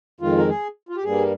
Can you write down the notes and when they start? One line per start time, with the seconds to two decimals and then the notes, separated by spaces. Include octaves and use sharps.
0.20 F2 D#3 G#3 F4
0.38 A#4
0.48 G#4
0.89 F4
0.96 G4
1.03 G2 G3 A#3 G#4